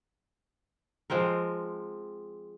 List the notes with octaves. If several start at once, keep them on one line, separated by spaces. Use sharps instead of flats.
F3 G#3 C4 A#4